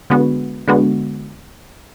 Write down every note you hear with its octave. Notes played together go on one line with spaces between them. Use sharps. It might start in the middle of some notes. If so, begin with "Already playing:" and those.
D3 G#3 B3 F#4
D3 G#3 B3 F#4